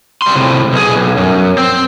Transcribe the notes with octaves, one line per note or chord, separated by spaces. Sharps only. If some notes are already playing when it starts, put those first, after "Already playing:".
G3 C6
A2 C3
B1 G#4
B1
F#2
C4